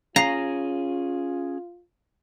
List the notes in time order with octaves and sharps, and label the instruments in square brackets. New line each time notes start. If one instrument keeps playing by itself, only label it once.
[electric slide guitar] C#4 G#4 [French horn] F4 [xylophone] F5 C7 [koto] A#5